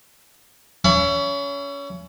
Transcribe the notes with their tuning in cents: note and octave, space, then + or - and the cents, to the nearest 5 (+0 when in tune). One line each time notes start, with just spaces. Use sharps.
C#4 +25 E5 +45 B5 +0